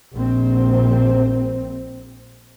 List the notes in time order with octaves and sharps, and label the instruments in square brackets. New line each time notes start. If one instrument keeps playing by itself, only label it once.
[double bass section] A#1 C4